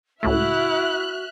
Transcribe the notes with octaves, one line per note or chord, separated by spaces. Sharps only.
C#2 A2 A3 E4 F#4 E5 F6 F#6